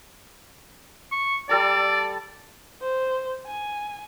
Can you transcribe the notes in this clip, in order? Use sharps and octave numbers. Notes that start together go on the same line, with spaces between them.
C#6
G3 A4 D5 A5
C5
G#5